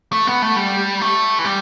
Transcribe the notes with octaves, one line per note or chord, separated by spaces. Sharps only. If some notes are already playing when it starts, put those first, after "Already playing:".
A3
B3
A3
G3
A3
E3
G3